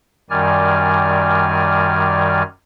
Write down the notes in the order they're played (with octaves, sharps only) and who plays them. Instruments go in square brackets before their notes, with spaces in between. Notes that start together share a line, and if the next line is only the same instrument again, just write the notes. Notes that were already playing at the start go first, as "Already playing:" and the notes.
[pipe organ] F#2 D#3 G3 D5 G#5 F6